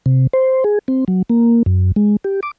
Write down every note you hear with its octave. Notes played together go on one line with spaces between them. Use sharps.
C3
C5
G#4
C4
F#3
A#3
F#2
G#3
G4
D6